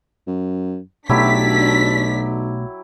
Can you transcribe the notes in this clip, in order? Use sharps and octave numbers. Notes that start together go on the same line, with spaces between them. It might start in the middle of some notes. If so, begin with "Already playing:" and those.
F#2
B1 B2 F#3 A3 D4 E4 G4 B6